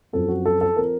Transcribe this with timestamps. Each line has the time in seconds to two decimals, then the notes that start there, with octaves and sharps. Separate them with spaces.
0.13 F#2 F3 C4 A4
0.28 F#4
0.46 A4
0.61 A4
0.76 F3 C4 A#4